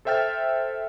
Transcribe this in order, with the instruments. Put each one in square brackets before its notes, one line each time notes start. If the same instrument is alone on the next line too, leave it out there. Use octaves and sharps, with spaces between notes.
[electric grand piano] A4 C5 E5 G5 F6 A6